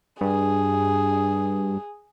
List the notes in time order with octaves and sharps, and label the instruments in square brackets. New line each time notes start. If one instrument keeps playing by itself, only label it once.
[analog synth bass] G2 [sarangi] G#4